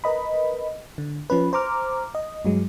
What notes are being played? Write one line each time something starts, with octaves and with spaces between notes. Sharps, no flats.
A#4 B4 D#5 B5
D3
F3 C#4 B4
C5 A#5 D6 F6
D#5
G2 F#3 G#3